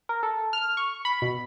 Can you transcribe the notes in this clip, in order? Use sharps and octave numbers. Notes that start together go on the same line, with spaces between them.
A#4
A4
F6
C#6
B5
B2